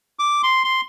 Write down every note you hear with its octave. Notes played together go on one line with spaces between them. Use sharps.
D6
C6
C6